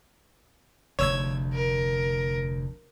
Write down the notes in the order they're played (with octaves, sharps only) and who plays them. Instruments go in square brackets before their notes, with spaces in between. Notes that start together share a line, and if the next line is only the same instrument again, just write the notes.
[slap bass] F1 D2 [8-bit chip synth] C#5 E6 G#6
[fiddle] A#4